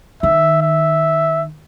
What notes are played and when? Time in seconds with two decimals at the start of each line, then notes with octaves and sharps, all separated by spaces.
0.23 D#3 E5
0.62 E5